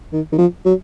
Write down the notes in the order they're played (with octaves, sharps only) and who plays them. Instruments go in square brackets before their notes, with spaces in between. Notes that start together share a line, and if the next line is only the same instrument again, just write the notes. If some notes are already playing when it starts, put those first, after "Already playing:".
[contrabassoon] D#3
D#3
F3
F#3